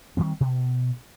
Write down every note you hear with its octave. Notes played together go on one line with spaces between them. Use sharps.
D#3 E3 G3 C4
B2